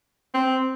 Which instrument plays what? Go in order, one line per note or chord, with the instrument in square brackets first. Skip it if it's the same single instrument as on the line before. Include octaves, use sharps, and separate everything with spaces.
[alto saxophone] C4